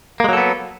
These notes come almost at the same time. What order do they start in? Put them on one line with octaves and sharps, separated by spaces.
A#3 G#3 F#3 A4 B3